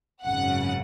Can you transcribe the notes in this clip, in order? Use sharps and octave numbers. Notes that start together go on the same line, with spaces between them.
G#1 F#2 C#3 F#5